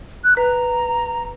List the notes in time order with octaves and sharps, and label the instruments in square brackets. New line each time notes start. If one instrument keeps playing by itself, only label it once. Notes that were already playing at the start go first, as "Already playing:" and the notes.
[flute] F#6
[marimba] B4 [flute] A#5